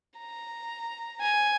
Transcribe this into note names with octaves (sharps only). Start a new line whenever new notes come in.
A#5
G#5